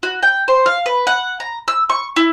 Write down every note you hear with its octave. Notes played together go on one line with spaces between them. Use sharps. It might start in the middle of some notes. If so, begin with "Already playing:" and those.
F#4
G5
C5
F5
B4
F#5
A#5
E6
C#6
E4